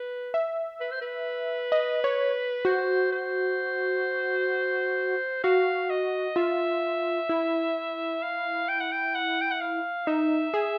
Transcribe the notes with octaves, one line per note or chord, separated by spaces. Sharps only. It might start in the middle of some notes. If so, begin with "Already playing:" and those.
Already playing: B4
E5
B4
C5
B4
D#5
C#5
F#4 C5
C5
F#4 F5
D#5
F4 E5
E4
F5
G5
F#5
G5
F#5
G5
F#5
F5
D#4 E5
G#4